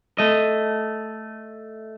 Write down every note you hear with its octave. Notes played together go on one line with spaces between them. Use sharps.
A3 D#5